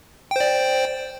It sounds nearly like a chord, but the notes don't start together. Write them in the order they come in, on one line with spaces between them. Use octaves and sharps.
G5 C5 D5